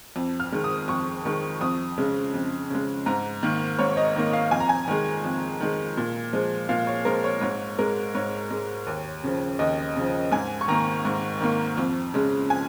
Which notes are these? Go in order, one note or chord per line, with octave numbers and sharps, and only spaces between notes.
F2
F6
D#3 G#3
D#6
F2 C#6
D#3 G#3
F2 D#6
C#3 G#3
F2
C#3 G#3
G#2 A#5
D#3 A#3
G#2 C#5
D#5
D#3 A#3
F5
F2 G#5
A#5
G#5
D#3 G#3
F2
D#3 G#3
A#2
F3 G#3
A#2 F5
C#5
F3 G#3 A#4
C#5
G#2 C#5
G#3 A#4
G#2 C#5
G#3
D#2
C#3 F3
D#2 D#5
C#3 F3
G#2 G#5
C#6
D#3 A#3 A#5
G#2
D#3 A#3
F2
C#3 G#3
G#5